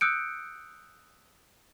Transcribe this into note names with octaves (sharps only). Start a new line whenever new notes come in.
D#6 E6 F#6 G6 C#7 D7